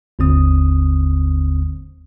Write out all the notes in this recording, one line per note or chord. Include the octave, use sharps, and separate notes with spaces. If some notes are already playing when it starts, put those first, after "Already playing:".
G1 D#2 D3 C4 D#6